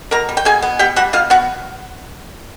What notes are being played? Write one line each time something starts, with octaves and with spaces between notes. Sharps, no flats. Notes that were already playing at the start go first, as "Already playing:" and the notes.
B2 A#4 A#5
G3
G5
B2 G#4 G#5
B3
B2 G4 G5
G3 F#4 F#5
B2 F4 F5
B3 F#4 F#5